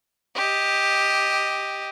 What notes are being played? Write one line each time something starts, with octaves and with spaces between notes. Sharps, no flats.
G4 D#5